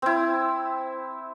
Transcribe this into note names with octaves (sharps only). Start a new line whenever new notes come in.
C4 E4